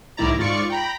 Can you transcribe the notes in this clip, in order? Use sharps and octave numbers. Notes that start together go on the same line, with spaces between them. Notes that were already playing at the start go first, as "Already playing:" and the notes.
C2 A2 D#3 E4 D5 A#5
G#2 F4 D5 C#6 C#7
G5 A#5 B5